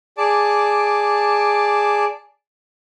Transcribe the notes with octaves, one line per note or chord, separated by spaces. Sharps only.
G#4 D5 A5 D6